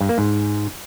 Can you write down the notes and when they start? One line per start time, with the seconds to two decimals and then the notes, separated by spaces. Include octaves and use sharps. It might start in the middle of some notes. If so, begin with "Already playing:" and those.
0.01 G2
0.09 A#3
0.18 G#2